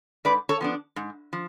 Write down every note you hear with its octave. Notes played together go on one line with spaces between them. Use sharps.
G#2 B4 D5
A4 C#5
F3 B3 D4
G#2
F3